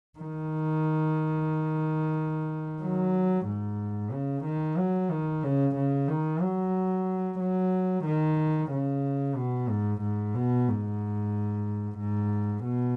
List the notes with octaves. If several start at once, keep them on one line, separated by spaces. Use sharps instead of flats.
D#3
F#3
G#2
C#3
D#3
F#3
D#3
C#3
C#3
D#3
F#3
F#3
D#3
C#3
B2
G#2
G#2
B2
G#2
G#2
B2